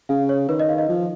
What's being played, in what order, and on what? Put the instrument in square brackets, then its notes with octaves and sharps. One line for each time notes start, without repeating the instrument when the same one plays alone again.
[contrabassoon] C#3 [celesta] F5
[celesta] C#5
[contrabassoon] D#3 [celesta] B4
[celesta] D#5
F5
D#5
[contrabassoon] F3